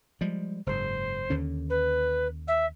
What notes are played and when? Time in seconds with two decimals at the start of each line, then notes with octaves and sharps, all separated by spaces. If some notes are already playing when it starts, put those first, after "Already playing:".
0.21 F3 G3 G#3
0.66 F#1 G#2 C5
1.30 D#2 D3 C#4
1.69 B4
2.47 E5